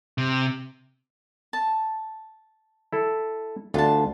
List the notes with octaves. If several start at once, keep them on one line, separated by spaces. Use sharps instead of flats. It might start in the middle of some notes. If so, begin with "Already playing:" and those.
C3
A5
E4 A4
D2 D4 F4 A5